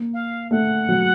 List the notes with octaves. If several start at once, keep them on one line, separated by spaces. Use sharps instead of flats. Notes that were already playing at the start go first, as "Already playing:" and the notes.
Already playing: A#3
F5
A3 F#5
F#3